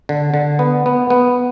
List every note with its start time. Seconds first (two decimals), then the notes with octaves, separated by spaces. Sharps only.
0.09 D3
0.34 D3
0.59 B3
0.86 B3
1.10 B3